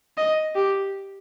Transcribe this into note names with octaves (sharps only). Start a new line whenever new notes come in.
D#5
G4